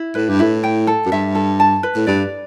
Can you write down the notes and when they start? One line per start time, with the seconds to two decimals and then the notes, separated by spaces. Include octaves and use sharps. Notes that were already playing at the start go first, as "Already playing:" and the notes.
Already playing: E4
0.15 A2 B4
0.29 G2
0.39 A2 E4
0.64 G5
0.87 A4
1.06 F#2
1.12 G2 E5
1.35 A4
1.60 A5
1.83 B4
1.96 A2
2.07 G2 D5